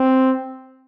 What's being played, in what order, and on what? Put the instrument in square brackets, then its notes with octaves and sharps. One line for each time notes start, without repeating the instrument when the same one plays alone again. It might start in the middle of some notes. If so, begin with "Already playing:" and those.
Already playing: [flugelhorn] C4